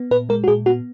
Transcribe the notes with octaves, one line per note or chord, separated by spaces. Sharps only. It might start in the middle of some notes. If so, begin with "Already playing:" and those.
Already playing: B3
A#2 B4
G#3 A#4
F#4
A#2 G#4
B3 F#4